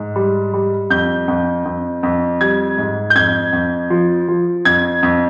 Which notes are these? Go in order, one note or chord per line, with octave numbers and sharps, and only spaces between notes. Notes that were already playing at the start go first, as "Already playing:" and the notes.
Already playing: G#2
G3
G3
F2 G6
F2
F2
F2
G3 G#6
G#2
G6
F2 G#6
F2
F3
F3
F2 G#6
F2